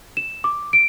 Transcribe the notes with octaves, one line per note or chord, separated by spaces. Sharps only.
E7
D6
D7